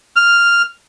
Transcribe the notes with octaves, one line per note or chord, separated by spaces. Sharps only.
F6